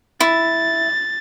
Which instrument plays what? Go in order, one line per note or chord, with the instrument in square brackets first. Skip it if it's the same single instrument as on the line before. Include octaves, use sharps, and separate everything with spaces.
[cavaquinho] E4 [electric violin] A6